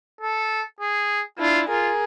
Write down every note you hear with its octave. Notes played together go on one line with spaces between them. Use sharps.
A4
G#4
D4 E4 F4
F4 G#4 A#4